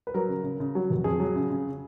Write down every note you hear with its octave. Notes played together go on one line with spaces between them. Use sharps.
B4
F#3 A#4
C#3
C#3
C#3
F#3
F1
F2 G#4
F#3
C#3
C#3